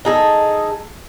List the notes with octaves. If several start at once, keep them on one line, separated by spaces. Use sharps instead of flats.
D#4 G#4 A4